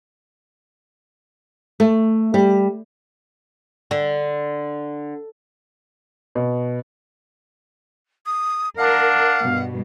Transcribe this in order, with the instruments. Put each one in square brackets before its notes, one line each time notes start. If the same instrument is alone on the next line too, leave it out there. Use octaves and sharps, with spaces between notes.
[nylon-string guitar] A3
G3
[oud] D3
[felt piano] B2
[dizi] D#6
[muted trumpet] D4 [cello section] A#4 [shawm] F5 [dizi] F#5
[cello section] G2 B2